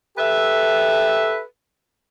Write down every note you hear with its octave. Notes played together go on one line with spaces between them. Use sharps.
G4 A4 B4 E5